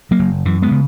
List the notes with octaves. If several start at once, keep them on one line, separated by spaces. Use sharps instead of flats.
F#3 A#3
F#1
F#2 E3
G#3 B3
C#3